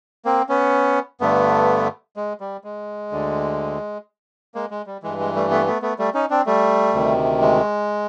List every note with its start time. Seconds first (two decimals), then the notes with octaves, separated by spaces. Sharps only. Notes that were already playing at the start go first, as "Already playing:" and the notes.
0.25 A#3 C4
0.49 B3 C#4
1.20 G2 D3 A3 B3
2.16 G#3
2.40 G3
2.64 G#3
3.11 D2 D3
4.55 G#3 A#3
4.71 G#3
4.86 G3
5.03 G2 E3 G#3
5.19 G#3
5.35 G3 A3
5.50 A3 B3
5.66 A3 B3
5.82 A3 B3
5.99 G3 A3
6.14 C#4 D#4
6.30 C4 D4
6.46 G3 A3
6.93 D2 C3 D#3
7.41 G#3